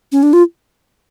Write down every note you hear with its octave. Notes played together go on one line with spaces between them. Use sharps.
C#4
D4
F4